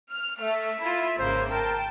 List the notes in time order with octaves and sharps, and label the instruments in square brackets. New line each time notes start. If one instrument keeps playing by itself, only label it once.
[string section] F6
[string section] A3 [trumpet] E5
[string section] E4 F4
[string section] G#1 C#3 A#3 [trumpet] C5
[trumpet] A#4 [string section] G5 A5